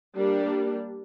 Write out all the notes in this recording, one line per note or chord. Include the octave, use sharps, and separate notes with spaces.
G3 A#3 D4 G4